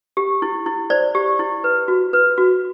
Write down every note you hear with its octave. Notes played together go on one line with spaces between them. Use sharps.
G4
E4
E4
C5 D5
G4
E4
B4
F#4
B4
F#4